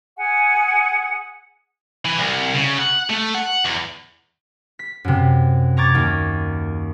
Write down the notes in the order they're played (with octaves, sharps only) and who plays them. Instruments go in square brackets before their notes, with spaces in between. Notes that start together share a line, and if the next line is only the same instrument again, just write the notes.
[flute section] G#4 F#5 G#5
[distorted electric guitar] E3
C2
C#3
F#5
A3
F#5
E2
[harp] B6
F#2 C3
A#5 C#6 D6 G#6 A6
D#2